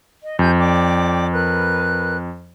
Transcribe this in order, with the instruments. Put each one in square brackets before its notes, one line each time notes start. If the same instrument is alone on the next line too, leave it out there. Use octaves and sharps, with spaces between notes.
[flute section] D#5
[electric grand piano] F2 [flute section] G4 G#5 G6
[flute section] D5 G5 D6
A#4 B4 F#6